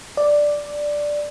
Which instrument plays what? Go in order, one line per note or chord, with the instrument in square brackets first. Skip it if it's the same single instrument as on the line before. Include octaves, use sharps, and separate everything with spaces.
[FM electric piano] D5